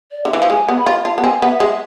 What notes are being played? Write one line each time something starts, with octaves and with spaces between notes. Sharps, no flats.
D5
D3 E5
E3
F3 F5
G#3 G#5
B3
B5
F4
F4 A5
B3
C4 G#5
B3 E5
G#3